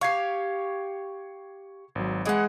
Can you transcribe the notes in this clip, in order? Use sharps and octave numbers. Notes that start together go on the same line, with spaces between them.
G4 F5 C#6 G#6 C7
G#1 F#3
E3 G#3 G#4 D#5 F#5